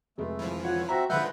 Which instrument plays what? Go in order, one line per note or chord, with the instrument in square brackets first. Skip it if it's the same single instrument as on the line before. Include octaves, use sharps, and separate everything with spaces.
[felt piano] F1 G#3 [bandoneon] A3
[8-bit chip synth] E3 F3
[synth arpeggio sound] F4 [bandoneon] C#5 F#5
[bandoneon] C4 F#4 E5 [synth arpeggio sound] A#5 [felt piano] A#6
[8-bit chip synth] D3 F3 G#3 [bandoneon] B4 F#5 G6 [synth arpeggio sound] E5